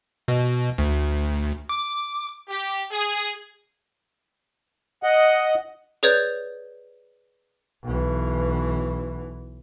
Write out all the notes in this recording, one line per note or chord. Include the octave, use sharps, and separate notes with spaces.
B2
D2
D6
G4
G#4
D#5 F#5
G#4 B4 C#5 D5 G6 G#6
B1 E3